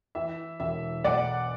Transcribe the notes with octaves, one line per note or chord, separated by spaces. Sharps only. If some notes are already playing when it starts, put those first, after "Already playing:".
E3 E5
E1 E5
B1 D5 F#5